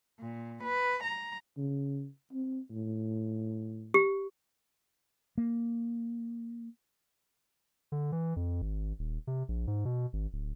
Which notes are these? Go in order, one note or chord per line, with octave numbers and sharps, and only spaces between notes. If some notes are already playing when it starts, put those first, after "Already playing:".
A#2
B4
A#5
C#3
C4
A2
G4
A#3
D3
E3
F2
G#1
D#1
C3
A#1
G#2
B2
G#1
D1